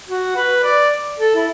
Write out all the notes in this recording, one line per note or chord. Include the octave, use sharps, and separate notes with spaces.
F#4
B4
D5
A4
E4